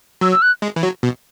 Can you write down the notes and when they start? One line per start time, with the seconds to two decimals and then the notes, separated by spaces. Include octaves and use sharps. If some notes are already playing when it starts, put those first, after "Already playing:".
0.21 F#3 E6
0.32 E6
0.42 F#6
0.62 G#3
0.76 E3
0.83 F#3
1.03 B2